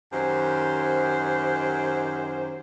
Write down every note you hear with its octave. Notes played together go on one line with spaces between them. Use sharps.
F#2 D#3 G4 C5